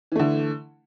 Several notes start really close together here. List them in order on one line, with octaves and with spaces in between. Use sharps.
E3 A3 D3